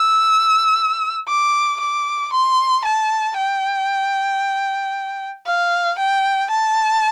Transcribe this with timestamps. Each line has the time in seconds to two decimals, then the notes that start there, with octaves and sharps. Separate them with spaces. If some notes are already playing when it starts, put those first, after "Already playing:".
Already playing: E6
1.28 D6
1.80 D6
2.33 C6
2.85 A5
3.37 G5
5.46 F5
5.99 G5
6.51 A5